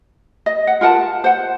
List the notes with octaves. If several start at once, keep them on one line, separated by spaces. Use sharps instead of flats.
D#5
F#5
F4 A#4 F#5 A5
C5 F#5